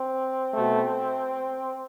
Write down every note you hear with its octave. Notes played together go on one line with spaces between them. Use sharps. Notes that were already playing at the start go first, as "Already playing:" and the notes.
Already playing: C4
B2 A3